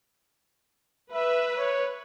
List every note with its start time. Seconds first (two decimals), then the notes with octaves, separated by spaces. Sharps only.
1.13 B4 E5
1.58 C#5